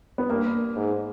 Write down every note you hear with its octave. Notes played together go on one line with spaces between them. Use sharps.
B3
G2 A#3
G#2